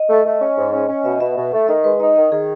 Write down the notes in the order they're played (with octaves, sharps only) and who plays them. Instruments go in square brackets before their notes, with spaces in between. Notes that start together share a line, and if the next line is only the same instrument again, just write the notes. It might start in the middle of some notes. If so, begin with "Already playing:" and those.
Already playing: [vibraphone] D#5
[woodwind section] A3
A3
C#4
G#2
C#4
C#4
[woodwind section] B2 [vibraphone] E5
[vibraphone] D#5
[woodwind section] B2 [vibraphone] E5
[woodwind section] B2
A3
[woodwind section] D#3 [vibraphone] D#5
[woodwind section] G#3 [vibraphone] B4
[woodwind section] D#4 [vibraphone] D#5
[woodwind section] D#3 [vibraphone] D#5
[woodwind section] D#3 [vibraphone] G#4